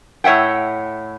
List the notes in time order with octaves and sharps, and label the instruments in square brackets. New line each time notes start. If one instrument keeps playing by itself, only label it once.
[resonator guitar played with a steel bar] A2 C#5 E5 F#5 G5